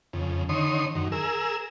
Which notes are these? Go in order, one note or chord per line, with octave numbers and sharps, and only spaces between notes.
F2 C#3
D3 D#3 C#5 C6 D#6
F#2 D#3
G#4 A#4 E6